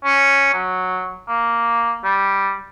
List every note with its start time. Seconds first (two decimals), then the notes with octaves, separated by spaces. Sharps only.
0.04 C#4
0.54 F#3
1.28 A#3
2.04 G3